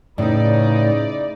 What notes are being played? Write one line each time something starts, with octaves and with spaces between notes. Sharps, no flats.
A2 C#3 D#4 E4 B4 D5